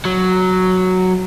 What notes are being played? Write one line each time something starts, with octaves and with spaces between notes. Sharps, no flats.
F#3